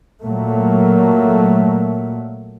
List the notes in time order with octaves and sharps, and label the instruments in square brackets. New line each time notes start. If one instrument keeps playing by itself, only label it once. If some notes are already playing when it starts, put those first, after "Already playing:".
[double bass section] A#2 F#3 A3 A#3